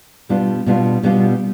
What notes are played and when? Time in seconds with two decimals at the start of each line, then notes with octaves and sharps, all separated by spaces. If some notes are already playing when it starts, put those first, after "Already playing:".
0.29 B2 G3 B3 D4 F4
0.66 B2 G3 B3 D4 F4
1.03 B2 G3 B3 D4 F4